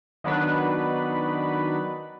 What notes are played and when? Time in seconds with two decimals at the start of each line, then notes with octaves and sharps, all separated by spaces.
0.24 D#3 F#3 B3 D4 B4